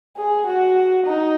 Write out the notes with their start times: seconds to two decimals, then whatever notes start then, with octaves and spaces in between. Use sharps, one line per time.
0.17 G#4
0.47 F#4
1.06 D#4